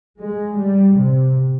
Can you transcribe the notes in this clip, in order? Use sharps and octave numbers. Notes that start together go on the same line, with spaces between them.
G#3
G3
C3